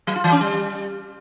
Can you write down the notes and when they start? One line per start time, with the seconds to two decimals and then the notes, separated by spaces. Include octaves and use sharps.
0.07 F#3
0.16 F4
0.24 E3
0.32 C#4
0.41 G3